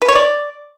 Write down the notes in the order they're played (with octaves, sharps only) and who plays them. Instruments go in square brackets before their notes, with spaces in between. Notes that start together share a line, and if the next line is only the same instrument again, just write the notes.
[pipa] B4
C#5
D5